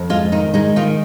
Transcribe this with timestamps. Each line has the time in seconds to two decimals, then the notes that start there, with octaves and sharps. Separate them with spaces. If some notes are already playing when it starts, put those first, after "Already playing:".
Already playing: F2
0.10 G#3 F4
0.32 D#3 D#4
0.54 G#3 D#4
0.76 D#3 F4